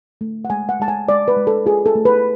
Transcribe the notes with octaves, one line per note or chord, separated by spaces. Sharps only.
A3
F#5
G#3 G#5
F#5
G#3 A5
G#5
G#3 D5
B4
G#3
A4
F4 G#4
A4
A3
B4